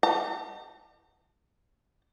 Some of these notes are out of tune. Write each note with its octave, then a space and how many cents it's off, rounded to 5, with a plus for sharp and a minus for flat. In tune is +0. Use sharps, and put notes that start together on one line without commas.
A#5 -45